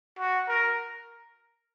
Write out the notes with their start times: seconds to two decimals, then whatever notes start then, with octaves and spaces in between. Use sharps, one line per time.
0.19 F#4
0.48 A#4